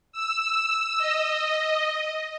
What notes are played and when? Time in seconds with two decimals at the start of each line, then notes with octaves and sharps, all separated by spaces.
0.12 E6
0.98 D#5